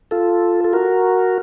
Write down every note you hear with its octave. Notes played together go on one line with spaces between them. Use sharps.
F4 A4
A4
F#4 A#4